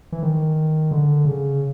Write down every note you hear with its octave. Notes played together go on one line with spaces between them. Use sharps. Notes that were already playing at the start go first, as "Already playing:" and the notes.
E3
D#3
D3
C#3